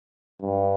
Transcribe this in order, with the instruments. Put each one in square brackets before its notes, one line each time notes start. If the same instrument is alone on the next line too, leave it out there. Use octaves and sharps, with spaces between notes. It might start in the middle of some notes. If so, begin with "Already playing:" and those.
[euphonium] G2